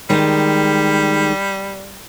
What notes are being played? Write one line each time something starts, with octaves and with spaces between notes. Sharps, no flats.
D#3 G3 G#3